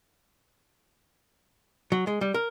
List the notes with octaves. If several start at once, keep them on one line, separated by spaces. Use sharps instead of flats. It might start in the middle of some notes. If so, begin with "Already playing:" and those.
F#3
G#3
G3
A#4